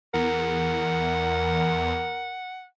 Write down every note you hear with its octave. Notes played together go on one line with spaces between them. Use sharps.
E2 A#4 F#5